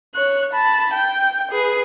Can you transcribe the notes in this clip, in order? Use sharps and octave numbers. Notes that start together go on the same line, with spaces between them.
C#5 F#6
A5 B5
G5
G#4 B4